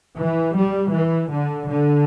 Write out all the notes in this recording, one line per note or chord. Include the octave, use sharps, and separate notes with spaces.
E3
G3
E3
D3
D3